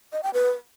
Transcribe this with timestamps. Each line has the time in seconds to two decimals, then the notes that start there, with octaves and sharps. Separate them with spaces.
0.13 D#5
0.23 G5
0.34 B4